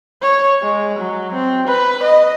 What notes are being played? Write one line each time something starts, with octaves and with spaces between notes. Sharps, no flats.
C#5
G#3
F#3
C4
B4
D#5